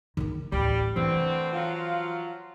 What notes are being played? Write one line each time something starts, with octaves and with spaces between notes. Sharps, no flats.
D#3 D#4
A1 D2 G3
A2 D3 E3 C4
F3 F#3 F4